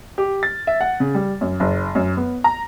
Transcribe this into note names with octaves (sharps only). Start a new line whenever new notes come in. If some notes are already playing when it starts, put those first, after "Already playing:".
G4
A6
E5
F#5
C#3
G3
F#2
F#1
F#2
B3
A#5